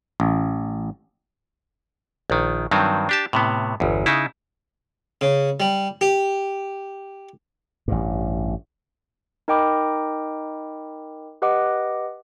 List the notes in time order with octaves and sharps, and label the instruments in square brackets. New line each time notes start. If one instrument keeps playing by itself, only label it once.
[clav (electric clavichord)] A1
A#1 D#3
G2 D#3 F#3 C4
D4 G4 A5
A2 C3 B3
G1 E2
C#3 D#4 E4
[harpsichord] C#3
G3
G4
[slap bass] A1 G2
[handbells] D#4 A#4 D#5 G5 B5 D6
G4 B4 D#5 F#5 D6